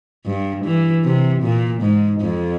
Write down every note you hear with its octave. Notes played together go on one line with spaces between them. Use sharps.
G2
E3
C3
A#2
G#2
F2